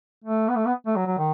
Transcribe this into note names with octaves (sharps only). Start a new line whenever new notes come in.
A3
B3
A3
B3
A3
F#3
F#3
D#3